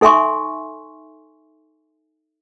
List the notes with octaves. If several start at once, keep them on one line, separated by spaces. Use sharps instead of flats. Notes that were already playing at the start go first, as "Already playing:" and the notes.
D#4 A4 E5 G#5 C6 C#6